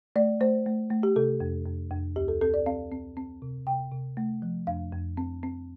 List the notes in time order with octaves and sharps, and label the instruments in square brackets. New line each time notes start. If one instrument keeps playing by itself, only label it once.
[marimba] A3 D5
A3 C5
A3
A3
G4
C3 A4
F2
F2
F2
D2 G4
A4
C4 A4
D5
C4 F5
C4
C4
C3
C3 G5
C3
A3
F3
F2 F5
F2
C4
C4